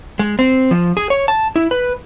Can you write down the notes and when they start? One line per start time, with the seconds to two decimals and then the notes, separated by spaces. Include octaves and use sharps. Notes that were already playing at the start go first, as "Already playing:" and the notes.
0.19 G#3
0.39 C4
0.71 F3
0.97 G#4
1.10 C#5
1.28 A5
1.56 E4
1.71 B4